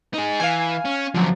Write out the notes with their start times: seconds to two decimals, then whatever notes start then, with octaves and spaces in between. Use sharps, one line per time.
0.14 D#4 G#4
0.40 E3 F5 G#5
0.85 C#4
1.14 F#2 D3 F3 F#3